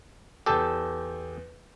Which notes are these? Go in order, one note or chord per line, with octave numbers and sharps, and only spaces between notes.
E2 G4 A4 A5 G6